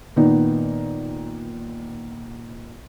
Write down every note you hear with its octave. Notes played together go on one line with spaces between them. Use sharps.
A#2 D#3 B3 D#4